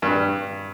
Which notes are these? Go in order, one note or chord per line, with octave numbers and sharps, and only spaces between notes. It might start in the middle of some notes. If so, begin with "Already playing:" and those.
G2